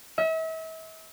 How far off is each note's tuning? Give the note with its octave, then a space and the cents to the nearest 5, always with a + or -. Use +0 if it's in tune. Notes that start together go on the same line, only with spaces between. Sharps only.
E5 -40